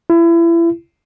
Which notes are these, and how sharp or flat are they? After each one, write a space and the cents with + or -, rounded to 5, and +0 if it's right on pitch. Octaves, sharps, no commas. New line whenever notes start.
E4 +30